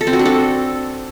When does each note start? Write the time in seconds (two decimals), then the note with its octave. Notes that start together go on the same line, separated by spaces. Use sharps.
0.01 A4
0.07 C4
0.13 F#4
0.19 D4
0.26 A4